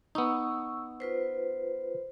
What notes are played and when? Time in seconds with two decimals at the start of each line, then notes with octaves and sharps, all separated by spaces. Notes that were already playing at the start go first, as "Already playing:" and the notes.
0.15 B3 D#4 C#6 E6
1.00 F4 B4 C5